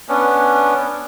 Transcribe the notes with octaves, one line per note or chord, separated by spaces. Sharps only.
B3 C#4 D4